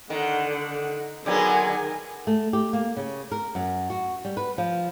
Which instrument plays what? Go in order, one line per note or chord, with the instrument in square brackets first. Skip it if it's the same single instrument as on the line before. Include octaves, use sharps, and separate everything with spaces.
[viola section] D3 F#5 [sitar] D#3
[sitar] D3 F#3 B3 [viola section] D#3 G#4 G#5
[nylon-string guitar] A3
G4
A#3
C#3
A#4
F#2
F#4
G3
B4
F3